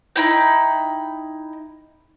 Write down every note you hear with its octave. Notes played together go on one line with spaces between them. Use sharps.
D#4 E4 G5